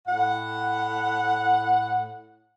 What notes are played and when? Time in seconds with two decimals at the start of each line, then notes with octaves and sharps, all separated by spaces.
0.06 A2 F#5